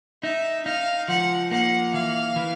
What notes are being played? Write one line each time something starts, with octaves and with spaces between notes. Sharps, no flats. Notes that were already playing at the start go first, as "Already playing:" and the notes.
D#4 E5
D#4 F5
F3 F#5
A#3 F#5
E3 F5
E3